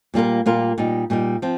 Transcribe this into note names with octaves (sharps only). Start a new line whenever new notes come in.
A#2 G3 A#3 F4 A#4
A#2 G3 A#3 F4 A#4
A#2 G3 D#4
A#2 G3 D#4
F3 C4